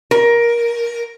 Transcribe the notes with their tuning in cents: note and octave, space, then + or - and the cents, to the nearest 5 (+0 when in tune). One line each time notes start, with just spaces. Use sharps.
A#4 +15